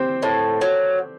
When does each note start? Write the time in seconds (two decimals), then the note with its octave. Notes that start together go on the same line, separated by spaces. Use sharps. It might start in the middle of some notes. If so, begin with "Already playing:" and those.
Already playing: C4 G4 C5
0.23 A2
0.61 F#3